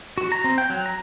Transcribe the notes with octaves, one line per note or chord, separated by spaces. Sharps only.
F#4
A#5
C4
G5
F#3
A#5